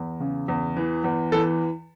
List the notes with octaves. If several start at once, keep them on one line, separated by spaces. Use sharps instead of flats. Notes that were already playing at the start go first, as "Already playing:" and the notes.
Already playing: E2
C#3
E2
E3
E2
E3 A4